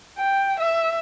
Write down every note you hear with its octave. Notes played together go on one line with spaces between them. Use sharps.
G5
E5